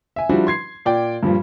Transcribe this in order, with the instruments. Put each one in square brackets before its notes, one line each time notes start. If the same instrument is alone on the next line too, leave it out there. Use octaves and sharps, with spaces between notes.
[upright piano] E5 G#5
F3 G3 D4 E4 F#4
C6 G#6 C7
A#2 D5 G5
G2 A#2 F3 G3